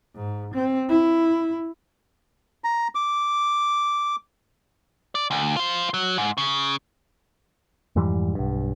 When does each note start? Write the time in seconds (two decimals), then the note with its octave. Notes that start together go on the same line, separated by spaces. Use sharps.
0.16 G#2
0.54 C4
0.89 E4
2.64 A#5
2.95 D6
5.15 D5
5.31 D2
5.57 F4 C5
5.94 F#3
6.18 G#2
6.38 C#3
7.96 F2 G#2 E3 G3
8.35 B1 G2